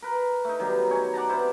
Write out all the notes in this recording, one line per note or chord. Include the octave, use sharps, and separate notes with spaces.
A#4 B4
A3 D#4
D#3 F#3 G3 B3
D#4 C#5 G#5
D5 F#5 A5 A#5
C3 B3 E4 C5